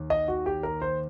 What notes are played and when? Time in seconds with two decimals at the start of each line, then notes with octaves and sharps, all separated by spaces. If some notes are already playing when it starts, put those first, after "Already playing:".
Already playing: D#2
0.10 D#5
0.28 F#4
0.46 G4
0.63 A#4
0.81 C5